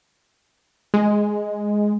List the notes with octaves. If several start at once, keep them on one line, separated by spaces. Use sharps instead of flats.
G#3